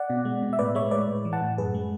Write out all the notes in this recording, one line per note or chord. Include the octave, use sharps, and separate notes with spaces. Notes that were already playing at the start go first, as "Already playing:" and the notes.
Already playing: D5 F#5
B2
G#3
B2
E5
A2 B4 D5
G#3 C#5 E5
A2 B4 D5
A2
E3
F#5 A5
A2
F#2 G#4 B4
G#3